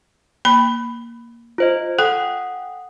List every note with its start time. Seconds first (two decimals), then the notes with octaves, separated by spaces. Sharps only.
0.45 A#3 B5
1.58 F4 C5 D#5
1.99 A4 F#5 G5 D#6